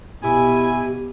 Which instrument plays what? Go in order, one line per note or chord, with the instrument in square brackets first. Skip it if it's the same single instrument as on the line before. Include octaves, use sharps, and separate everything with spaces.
[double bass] B2 [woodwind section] E4 G#5 [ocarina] G4